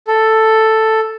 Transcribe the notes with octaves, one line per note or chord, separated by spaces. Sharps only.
A4